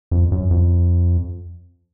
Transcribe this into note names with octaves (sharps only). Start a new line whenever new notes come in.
F2
F#2
F2